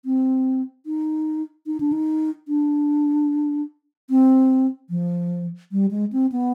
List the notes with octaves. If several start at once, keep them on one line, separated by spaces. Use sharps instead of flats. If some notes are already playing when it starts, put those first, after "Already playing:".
C4
D#4
D#4
D4
D#4
D4
C4
F3
G3
G#3
C4
B3